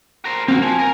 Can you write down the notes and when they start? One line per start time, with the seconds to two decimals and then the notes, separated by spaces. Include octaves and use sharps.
0.25 A#4 C5
0.48 A#3 C4 F#4
0.62 F3 G#5
0.79 A#4